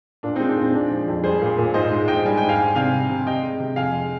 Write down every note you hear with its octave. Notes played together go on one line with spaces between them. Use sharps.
A#2 D4
C4 D#4
G#3
D4
A#2 C4
G#3 D4
F3
F2
G3 G#4 C5
A#2
A#2
G#2 C5 D#5
G#3
G#2 D#5 G5
G3 G#5
G5
G#2
F5 G#5
G#2
C3 F5 G#5
G3
C3
C3 D#5 G5
G#3
C3
F2 F5 G#5
G#3